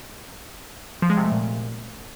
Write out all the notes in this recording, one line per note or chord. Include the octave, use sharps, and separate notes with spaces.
F3
G#3
C3
A3
A#2